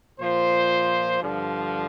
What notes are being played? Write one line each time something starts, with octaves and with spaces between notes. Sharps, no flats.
A#2 F3 C5
G2 D3 F3